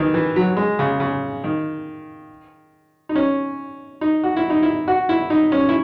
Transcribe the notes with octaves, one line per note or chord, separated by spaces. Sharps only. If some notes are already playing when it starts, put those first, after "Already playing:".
Already playing: D#3 E3
E3
F#3
G#3
C#3
C#3
D#3
D#4
C#4
D#4
F#4
E4
D#4
E4
F#4
E4
D#4
C#4
E4